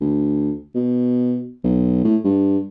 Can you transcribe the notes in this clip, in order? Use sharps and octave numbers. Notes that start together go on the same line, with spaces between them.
D2
B2
B1
A2
G2